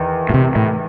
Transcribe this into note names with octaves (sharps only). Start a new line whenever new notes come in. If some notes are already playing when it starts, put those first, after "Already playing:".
Already playing: E2 D#3
A2
C3
A2